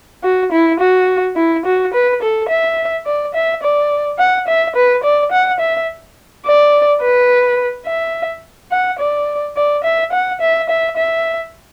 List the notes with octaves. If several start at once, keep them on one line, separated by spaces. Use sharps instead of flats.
F#4
E4
F#4
E4
F#4
B4
A4
E5
D5
E5
D5
F#5
E5
B4
D5
F#5
E5
D5
B4
E5
F#5
D5
D5
E5
F#5
E5
E5
E5